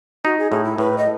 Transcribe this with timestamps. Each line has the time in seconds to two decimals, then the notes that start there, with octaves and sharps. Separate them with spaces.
0.25 D#4 F#4
0.38 G#4
0.52 A2 G#4
0.64 E4
0.78 A2 B4
0.98 D#5